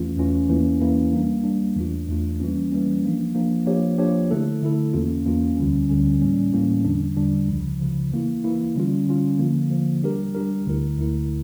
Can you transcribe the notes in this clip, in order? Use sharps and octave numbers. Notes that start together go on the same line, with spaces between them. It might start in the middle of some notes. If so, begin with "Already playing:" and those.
Already playing: E2 E3 A3 C#4 F4
E2 E3 A3 C#4 F4
E2 E3 A#3 C#4 E4
E2 E3 A#3 C#4 E4
G3 A#3 D4
G3 A#3 D4
E2 E3 A3 D4 F4
E2 E3 A3 D4 F4
E3 G3 A#3 C#4
E3 G3 A#3 C#4
F3 A#3 D4
F3 A#3 D4
F3 A#3 D4 G4 C#5
F3 A#3 D4 G4 C#5
D3 A3 E4 A4
D3 A3 E4 A4
E2 E3 A#3 C#4 F4
E2 E3 A#3 C#4 F4
D2 D3 G3 C#4
D2 D3 G3 C#4
A2 E3 G3 A#3 C#4
A2 E3 G3 A#3 C#4
E2 D3 G3 D4
E2 D3 G3 D4
C#2 C#3 F3
C#2 C#3 F3
E3 A#3 E4
E3 A#3 E4
D3 G3 C#4 F4
D3 G3 C#4 F4
D3 F3 A#3
D3 F3 A#3
G3 D4 G4 A#4
G3 D4 G4 A#4
D2 D3 A3 E4 A#4
D2 D3 A3 E4 A#4